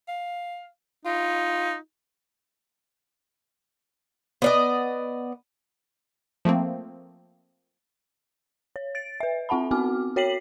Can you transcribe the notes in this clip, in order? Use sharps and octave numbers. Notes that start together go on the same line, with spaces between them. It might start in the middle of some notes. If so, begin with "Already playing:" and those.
F5
D#4 F4
B3 D5 D#5
F3 A3 A#3 C4
C#5
A6 D7
B4 E5
C4 F4 F#5 A5 B5
B3 C4 F#4 D6 F6
F#4 C#5 G5 B6 C7 F#7